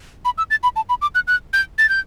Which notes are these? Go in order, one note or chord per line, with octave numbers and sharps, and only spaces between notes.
B5
E6
A6
B5
A5
B5
D6
F#6
F#6
G6
A6
G6